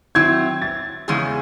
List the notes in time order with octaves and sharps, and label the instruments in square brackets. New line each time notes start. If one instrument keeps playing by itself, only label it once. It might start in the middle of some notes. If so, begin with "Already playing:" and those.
[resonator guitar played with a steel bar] D#3 F#3 C4 E4 [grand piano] G#6
[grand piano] A6
[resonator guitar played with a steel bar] E2 C#3 G#3 C#4 G#4